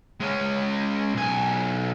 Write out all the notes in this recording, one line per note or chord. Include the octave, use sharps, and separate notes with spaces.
G#3 C#4
B1 G#5